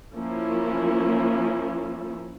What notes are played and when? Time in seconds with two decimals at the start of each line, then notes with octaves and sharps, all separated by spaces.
0.14 F3 A#3 C#4 E4